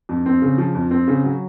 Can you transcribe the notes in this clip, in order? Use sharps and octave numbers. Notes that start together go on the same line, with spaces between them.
F2
C4
C#3
F3
F2
C4
C#3
F#3